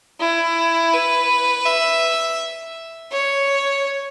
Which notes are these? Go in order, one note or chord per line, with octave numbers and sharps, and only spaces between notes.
E4
B4
E5
C#5